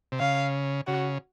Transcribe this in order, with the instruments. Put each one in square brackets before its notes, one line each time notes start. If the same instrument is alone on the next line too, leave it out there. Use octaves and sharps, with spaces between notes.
[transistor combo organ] C3
[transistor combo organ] C#3 [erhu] F5
[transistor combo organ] C#3 [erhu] F#4